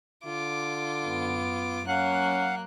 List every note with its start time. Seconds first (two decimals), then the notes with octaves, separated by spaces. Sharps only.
0.25 D3 F4 D6
1.03 F#2 B3
1.88 F#3 A#3 C#4 F5 F#5 F#6